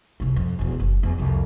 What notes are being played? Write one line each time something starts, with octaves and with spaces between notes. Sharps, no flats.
C2 G2
F2
E1 E2
F#1
E2 F#3
C2 F2